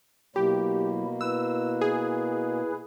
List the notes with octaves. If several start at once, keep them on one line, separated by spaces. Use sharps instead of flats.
B2 F#3 A#3 E4 G4
E4 B4 E6
G#4